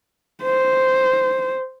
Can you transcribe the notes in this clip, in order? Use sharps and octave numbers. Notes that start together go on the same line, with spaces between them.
C5